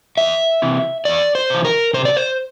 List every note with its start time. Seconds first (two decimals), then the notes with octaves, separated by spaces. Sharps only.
0.17 E2 E5
0.62 C3 E3
1.05 E2 D5
1.35 C5
1.50 C3 E3
1.65 A#4
1.93 C3 C5
2.05 D5
2.16 C5